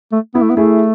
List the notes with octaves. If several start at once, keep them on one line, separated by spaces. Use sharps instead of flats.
A3
B3 E4
A3
B3
A3 E4 G#4